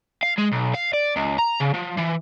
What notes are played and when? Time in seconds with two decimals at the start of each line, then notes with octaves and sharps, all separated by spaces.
0.23 F5
0.38 G#3
0.52 B1
0.74 F5
0.93 D5
1.16 C#2
1.38 A#5
1.60 C#3
1.74 F3
1.97 E3